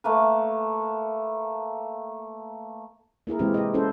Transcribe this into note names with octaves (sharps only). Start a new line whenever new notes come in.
A3 A#3 B4
A#3 E4 G#4 A#4
C3 E3 G#3 C4 F4 G4
G4 D#5
C#4 E4 A4 C5